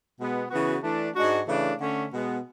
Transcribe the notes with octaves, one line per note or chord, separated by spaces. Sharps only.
B2 G#3 B3
C#3 E3 B3 F#4
E3 A3 D4
G#2 G#3 D4 F#4
C#3 E3 A3 D4
D3 A3 C#4
B2 G#3 B3